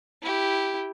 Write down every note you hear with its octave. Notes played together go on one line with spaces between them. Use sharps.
E4 G4